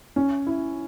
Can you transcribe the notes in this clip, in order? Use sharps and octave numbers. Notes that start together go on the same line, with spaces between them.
C#4
E4